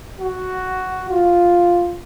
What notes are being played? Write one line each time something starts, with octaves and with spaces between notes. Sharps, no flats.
F#4
F4